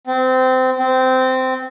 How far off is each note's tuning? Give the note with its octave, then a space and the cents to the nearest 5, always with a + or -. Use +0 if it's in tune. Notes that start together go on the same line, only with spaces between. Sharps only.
C4 -25
C4 -15